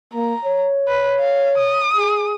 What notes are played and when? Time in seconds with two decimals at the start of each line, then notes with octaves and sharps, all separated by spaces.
0.14 A#3 A#5
0.45 C#5
0.88 B4
1.20 F5
1.58 D#6
1.96 G#4